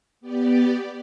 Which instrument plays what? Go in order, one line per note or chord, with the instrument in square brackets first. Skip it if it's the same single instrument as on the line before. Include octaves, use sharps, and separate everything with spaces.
[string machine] B3 G4 D5